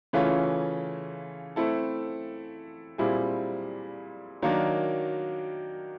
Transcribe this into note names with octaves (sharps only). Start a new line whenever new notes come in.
C#3 E3 A3 C#4 F4
A3 C4 E4 A4
A#2 G3 C4 E4 G#4
D#3 F#3 A#3 D4